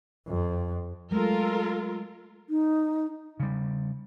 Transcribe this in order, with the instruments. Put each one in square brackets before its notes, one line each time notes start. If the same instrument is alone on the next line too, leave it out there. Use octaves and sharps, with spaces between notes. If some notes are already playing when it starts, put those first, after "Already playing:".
[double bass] F2
[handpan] F#3 G#3 A3 [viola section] F4 A4 A#4
[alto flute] D#4
[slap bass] C#3 G3